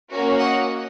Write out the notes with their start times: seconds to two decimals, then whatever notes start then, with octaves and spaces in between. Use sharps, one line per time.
0.11 A#3 C#4 F#4
0.39 D#5 F#5